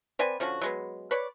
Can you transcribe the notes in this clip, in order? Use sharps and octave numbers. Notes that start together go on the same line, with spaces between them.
C4 B4 D5 G#5
D3 F3 C#4 F#4
F#3 G#3 B3
B4 C#5 D5